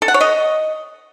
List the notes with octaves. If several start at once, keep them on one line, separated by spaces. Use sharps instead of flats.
A4
F#5
C#5
D#5